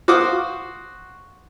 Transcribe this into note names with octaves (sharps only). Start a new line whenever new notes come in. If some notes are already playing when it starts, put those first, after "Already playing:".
F#4 C5 F5 D6 D#6